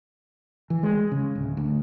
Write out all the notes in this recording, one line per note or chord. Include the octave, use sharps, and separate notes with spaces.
E3
G#3
C#3
D1
D2